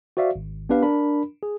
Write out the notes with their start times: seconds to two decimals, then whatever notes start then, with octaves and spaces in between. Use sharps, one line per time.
0.17 F#4 C5 D5 E5 F5
0.36 G#1
0.69 B3 D4 G4 B4 F5
0.83 D4 A#4 B5
1.43 G#4